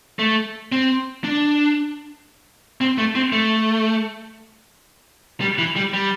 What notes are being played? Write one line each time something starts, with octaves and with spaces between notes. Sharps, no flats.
A3
C4
D4
C4
A3
C4
A3
G3
E3
G3
G3